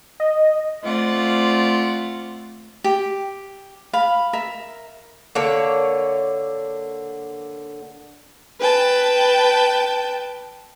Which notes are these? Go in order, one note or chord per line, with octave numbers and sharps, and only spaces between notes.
D#5
A3 C4 F4 D5 F#5
G4
F5 B5
A#4 E5
D3 A#3 C#5
B4 G5 A5